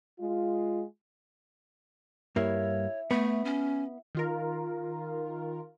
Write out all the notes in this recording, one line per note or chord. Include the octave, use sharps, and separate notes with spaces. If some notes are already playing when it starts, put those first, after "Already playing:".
G#3 F4
G2 A#3 E4 C#5
A3 B3
C#4
D#3 F4 A#4